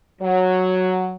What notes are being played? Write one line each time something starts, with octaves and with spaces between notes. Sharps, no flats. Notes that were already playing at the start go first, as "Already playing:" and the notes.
F#3